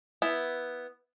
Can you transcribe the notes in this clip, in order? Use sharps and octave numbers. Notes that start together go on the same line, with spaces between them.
B3 E4